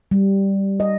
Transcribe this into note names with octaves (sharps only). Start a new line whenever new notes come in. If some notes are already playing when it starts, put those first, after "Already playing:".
G3
D#5